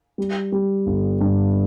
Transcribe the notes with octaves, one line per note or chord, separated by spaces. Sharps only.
G3
G3
G1
G2